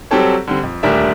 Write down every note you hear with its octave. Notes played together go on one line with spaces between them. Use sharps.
F#3 G3 C4 G4 A4 C#5
D3 G3 C4
F2
D#1 D2 G3 D4 A#4 E5